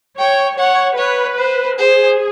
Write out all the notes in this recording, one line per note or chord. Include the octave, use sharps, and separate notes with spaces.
C#5 G5
C#5 F#5
B4 C#5
C5
G#4 C5